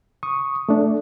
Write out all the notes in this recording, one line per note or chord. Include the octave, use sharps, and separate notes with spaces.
C#6 D#6
A3 D4